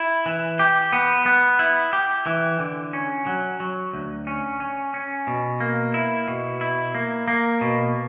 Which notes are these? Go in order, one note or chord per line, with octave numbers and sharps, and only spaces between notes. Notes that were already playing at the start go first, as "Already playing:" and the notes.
Already playing: E4
E3
G4
B3
B3
E4
G4
E3
D3
C#4
F#3
F#3
D2
C#4
C#4
C#4
B2
A#3
E4
B2
E4
A#3
A#3
B2